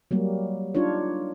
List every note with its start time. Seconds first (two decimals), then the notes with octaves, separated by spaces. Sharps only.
0.11 F#3 G3 A#3
0.75 D4 D#4 F4 C#5